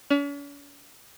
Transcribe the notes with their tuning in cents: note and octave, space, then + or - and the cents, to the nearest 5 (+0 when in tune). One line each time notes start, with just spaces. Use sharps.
C#4 +45